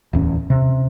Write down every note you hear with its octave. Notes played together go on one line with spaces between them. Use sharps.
D1 E2 C#4
C3